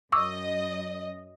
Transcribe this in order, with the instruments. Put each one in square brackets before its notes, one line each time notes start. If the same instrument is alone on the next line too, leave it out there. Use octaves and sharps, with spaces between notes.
[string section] F#2 D#5 [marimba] C#6 D6 E6